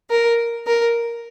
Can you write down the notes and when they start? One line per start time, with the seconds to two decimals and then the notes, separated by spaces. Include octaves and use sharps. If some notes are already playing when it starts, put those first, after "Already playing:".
0.10 A#4
0.66 A#4